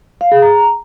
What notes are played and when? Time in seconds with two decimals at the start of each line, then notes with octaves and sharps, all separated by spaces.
0.21 F5
0.32 G#4
0.42 A#5